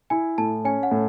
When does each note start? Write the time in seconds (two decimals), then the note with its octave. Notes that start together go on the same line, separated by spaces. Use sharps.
0.10 E4 G#5
0.38 A2 A5
0.65 C#4 G#5
0.83 F#5
0.91 A2